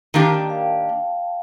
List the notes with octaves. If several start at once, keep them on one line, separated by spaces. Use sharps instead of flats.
D#3 A#3 D4 G4 A5
G5
F5